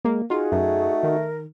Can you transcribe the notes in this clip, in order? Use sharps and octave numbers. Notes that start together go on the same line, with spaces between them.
G#3 A#3
D#4 F4 F#4 G#4
F#2 A3
D#3 A#4